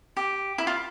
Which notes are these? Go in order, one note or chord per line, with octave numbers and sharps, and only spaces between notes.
G4
E4
F4